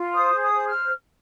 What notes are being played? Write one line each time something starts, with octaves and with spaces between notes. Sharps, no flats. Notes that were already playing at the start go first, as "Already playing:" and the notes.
Already playing: F4
C5 D#6
G#4
D#6
C5
F6